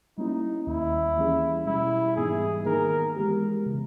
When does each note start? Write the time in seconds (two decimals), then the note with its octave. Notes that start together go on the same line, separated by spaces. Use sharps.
0.18 G3 A#3 C#4 D#4 E4
0.67 D#2 D#3 A#3 E4
1.17 E3 G3 A#3 C#4 G#4
1.66 B2 G3 C#4 E4
2.16 G#2 E3 G3 B3 D#4 G#4
2.65 D#3 A#3 D#4 G#4 A#4
3.15 E3 G#3 B3 G4 A#4
3.66 C#3 E3